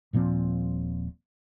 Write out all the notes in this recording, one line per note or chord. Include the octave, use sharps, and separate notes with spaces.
D#1 A#2 F3 C4